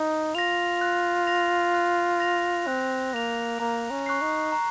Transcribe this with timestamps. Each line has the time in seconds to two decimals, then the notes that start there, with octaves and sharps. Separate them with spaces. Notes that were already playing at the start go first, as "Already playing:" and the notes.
Already playing: D#4
0.35 F4 A#6 F7
0.81 F#6
1.27 A#6 F7
1.74 F#6
2.20 A#6 F7
2.67 C4 F#6
3.13 A#3 A#6 F7
3.60 A#3 A#5
3.91 C#4
4.06 C#6 F#6 C7
4.22 D#4
4.52 A#5